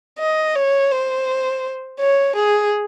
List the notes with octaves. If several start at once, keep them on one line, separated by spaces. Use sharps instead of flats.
D#5
C#5
C5
C#5
G#4